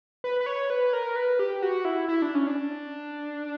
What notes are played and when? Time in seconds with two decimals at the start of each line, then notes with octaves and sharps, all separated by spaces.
0.24 B4
0.41 B4
0.46 C#5
0.70 B4
0.93 A#4
1.16 B4
1.39 G4
1.62 F#4
1.85 E4
2.08 E4
2.22 D4
2.35 C#4
2.47 D4